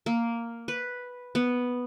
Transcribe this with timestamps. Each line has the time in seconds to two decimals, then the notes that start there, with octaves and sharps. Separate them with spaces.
0.06 A#3
0.68 B4
1.35 B3